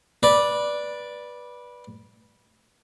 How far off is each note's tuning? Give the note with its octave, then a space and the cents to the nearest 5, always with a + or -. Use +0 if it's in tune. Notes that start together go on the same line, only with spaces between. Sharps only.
B4 -15 D5 +0